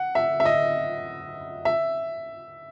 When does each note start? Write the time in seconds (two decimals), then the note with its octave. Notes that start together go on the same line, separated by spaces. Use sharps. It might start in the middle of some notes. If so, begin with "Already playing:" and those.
Already playing: F#5
0.15 E5
0.40 E5
0.45 D#5
1.65 E5